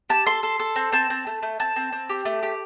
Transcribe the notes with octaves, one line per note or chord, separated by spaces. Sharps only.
G4 A5
A4 C6
A4
A4
C4
C4 A5
C4
A3
A3
C4 A5
C4
C4
G4
A3
G4